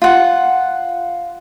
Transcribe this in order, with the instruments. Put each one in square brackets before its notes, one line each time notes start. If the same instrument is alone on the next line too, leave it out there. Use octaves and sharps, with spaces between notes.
[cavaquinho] F4 F#5